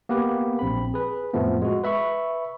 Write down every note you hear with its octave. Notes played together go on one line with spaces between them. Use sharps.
A#3 B3 G4 B4
A#1 C4 B5
G#4 B4
F2 A2 F3 A3 B3
G#3 F#4
B4 E5 B5 C#6